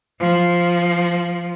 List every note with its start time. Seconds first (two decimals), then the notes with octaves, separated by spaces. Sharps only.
0.17 F3